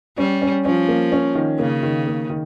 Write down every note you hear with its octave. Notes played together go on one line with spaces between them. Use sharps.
G3 C#4
C#4
F3 C#4
A#3
C#4
D#3
C#3 A#3
D#3
A#3
D#3